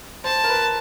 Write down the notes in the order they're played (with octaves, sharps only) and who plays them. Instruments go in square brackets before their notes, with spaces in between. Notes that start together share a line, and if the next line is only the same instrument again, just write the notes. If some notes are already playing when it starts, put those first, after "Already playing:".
[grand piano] C5 [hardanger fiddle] A5
[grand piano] A#4
B4